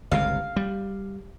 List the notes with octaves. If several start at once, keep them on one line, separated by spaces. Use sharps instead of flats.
G1 C#2 C3 F5
G3